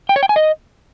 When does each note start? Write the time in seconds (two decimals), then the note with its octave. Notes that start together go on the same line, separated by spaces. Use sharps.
0.09 G5
0.16 C#5
0.23 G5
0.29 G#5
0.36 D#5